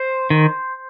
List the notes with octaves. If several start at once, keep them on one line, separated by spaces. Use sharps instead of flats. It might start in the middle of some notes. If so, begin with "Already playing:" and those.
Already playing: C5
D#3